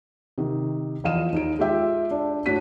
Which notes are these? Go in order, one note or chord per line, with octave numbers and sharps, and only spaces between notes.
C3 D#3
E2 F3 D#5 F5 D#7 E7
D#2 D#4 D7
G#3 F4 G4 E5 G5
D4 D5
A2 D4 F#4 B6 D#7